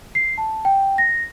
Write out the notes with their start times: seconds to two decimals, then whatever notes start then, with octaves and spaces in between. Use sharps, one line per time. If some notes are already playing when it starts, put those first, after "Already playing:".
0.15 C7
0.38 A5
0.65 G5
0.98 A#6